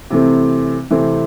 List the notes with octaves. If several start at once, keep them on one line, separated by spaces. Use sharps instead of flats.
C3 E3 A3 C4
C3 E3 A3 C4